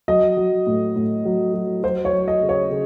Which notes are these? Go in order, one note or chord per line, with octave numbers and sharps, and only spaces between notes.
F#3 D#5
F#3
A2
A2
F#3
F#3
F#3 C5
C#5
F#3
D#5
C#3
C#5
C#3